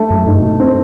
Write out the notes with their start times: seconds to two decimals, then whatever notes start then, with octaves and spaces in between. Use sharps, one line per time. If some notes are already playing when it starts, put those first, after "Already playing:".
Already playing: A3
0.10 F#2
0.27 G2 D#4
0.40 B2
0.49 A2
0.60 C4